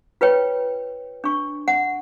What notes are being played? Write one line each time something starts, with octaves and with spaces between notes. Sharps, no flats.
F4 B4 C#5 G5
D4 C#6
F#5